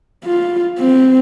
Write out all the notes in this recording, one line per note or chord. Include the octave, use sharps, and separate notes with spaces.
F4
C4